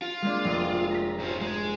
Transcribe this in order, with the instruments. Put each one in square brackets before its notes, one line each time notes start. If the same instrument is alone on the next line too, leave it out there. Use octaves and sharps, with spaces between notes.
[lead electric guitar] F4
[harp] G#3 A#3 D4
F1
A#5 B6
[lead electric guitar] G#2 F3
G#3